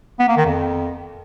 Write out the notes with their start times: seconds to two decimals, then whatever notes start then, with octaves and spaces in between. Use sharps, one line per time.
0.19 B3
0.28 A#3
0.37 D#3
0.46 F2